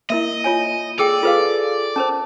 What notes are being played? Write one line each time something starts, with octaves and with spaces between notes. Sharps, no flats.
A#3 E4 A#4 D#5 E5
F4 C#5 G#5
G#4 A4 D5 G5 E6
F4 G#4 A4 B4 F5 D6
C#4 A#4 C5 A5